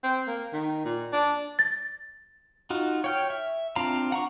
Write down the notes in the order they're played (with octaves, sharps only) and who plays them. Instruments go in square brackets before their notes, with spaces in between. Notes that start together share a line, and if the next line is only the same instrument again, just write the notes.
[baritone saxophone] C4
A#3
D#3
A#2
D4
[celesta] A6
[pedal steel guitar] D#4 F4 F#4
C#5 G5 F6
E5
C4 D4 F4 F5 A#5
F#5 A#5 C#6